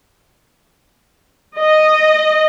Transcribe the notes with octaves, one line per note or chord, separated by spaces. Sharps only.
D#5